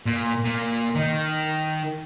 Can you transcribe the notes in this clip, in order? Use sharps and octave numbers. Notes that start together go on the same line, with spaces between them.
A#2
A#2
D#3